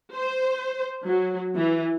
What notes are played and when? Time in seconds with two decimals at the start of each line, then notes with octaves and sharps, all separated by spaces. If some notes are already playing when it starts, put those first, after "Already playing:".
0.13 C5
1.05 F#3
1.55 E3